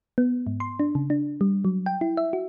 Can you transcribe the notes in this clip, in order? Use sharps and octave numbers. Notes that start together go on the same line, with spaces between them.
B3
G#2
C6
D4
C#3
D4
G3
F#3
G5
E4
E5
F#4